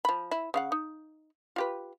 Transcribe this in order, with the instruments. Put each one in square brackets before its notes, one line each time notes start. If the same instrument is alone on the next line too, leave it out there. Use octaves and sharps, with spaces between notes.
[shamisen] F3 B5
E4
C#3 F5 F#5
D#4
F4 G4 B4